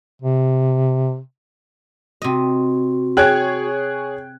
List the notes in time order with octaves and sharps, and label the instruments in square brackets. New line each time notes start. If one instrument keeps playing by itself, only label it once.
[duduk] C3
[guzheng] C3 D#5 [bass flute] F#4
[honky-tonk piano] G#4 C#5 G#6 [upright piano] G5 F#6